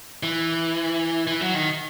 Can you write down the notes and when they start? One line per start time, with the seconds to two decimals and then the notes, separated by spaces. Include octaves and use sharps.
0.23 E3
1.27 E3
1.41 F#3
1.54 D#3